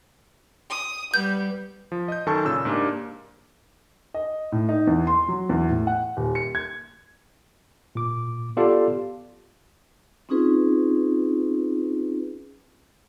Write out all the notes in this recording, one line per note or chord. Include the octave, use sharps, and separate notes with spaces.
D#6
G3 B3 G6
F3
D#5 G6
F#2 D#3 A4 G#5 A5 C#6
A#2 C#3 E6
G#2 A#3 D4 G4
D#5
A2
D#4
E2
C6
F#3
E2
A2
F#5
D#1
C#7
G#6
A#2 D6
B3 F4 G4 A4 D5 F5
C4 C#4 D#4 F4 G#4 B4